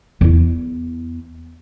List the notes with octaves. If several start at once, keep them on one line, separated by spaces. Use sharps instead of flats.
E2 E4